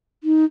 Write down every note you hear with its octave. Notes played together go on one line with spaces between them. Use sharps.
D#4